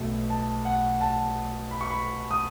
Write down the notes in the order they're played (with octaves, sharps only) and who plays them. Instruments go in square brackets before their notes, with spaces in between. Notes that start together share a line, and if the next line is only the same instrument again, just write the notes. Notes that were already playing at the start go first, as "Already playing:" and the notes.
Already playing: [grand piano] B1 B2 A3
A5
F#5
A5
B5
C#6
B5
D#6